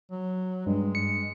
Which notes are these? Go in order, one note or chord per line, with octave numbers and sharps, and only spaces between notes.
F#3
G2 G#3
C#7